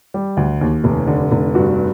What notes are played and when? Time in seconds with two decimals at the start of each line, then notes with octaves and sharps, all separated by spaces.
0.14 G3
0.37 D2
0.61 D#2
0.84 F1
1.07 D3
1.31 F1
1.55 G2 F#4